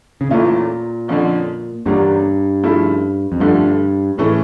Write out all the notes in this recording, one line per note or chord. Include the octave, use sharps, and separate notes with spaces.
C#3
E2 A#2 E3 A3 C#4 F4
F2 D3 F3 C#4
E2 G2 D3 G3 A#3 C#4
C#3 F3 A3 E4
F2
G2 D3 F3 A3
A2 C#3 E3 A3 C#4